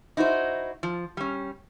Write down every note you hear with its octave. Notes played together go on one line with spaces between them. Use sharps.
D#4 E4 F#4 A4 C5
F3
G3 C#4